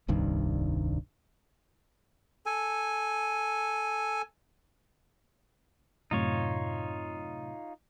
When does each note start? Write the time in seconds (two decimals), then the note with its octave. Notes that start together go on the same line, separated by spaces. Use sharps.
0.08 D#1 C2 G2 D#3
2.46 A4 G#5
6.11 F#2 A2 C3 D#4 F4 C#5